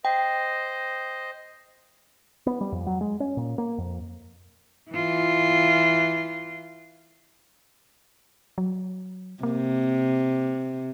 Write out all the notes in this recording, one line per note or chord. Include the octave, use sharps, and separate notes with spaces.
C5 D#5 G5
B3
G3
F2
F#3
G#3
C#4
A#2
A#3
F2
E3 F4
F#3
C3 A#3